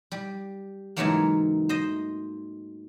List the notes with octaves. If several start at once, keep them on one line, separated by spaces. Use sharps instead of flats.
G3
G#2 C#3 E3 F#3 A3 A#3
C5 D#5